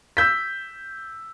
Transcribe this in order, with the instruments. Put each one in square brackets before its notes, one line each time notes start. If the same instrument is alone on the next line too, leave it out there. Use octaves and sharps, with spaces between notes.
[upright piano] E6 G6 B6